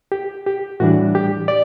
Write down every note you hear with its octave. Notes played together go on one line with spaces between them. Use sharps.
G4
G4
A2 E3 G3 D4 F#4
G4
D5